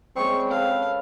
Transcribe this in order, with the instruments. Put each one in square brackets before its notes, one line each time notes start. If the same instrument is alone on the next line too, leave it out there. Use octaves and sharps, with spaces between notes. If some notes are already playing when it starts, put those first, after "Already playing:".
[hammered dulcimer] G3 G#3 C#4 [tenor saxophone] C4 [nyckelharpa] C#6
[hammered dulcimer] A4 B4 [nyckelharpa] F5